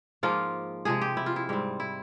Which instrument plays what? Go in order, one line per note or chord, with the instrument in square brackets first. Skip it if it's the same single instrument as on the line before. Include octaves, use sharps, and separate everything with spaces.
[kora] G#2 F3 A#3 F4
C3 F3 G#3 G#4
G4
E4
F4
E4
G#2 G3 C4
E4